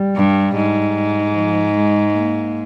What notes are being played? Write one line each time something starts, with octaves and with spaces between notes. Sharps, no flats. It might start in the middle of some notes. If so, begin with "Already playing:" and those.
Already playing: G3
G2
G#2
F3
G#3
A#3